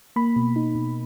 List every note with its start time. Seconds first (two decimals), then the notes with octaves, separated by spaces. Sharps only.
0.16 A#3 B5
0.36 B2
0.56 D#4
0.75 B2